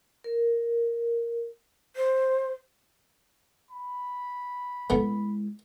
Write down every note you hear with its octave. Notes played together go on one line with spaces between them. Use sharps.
A#4
C5
B5
G#3 A3 B3 E4